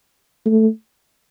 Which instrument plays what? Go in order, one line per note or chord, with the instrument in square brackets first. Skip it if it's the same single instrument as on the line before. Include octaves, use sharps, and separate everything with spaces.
[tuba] A3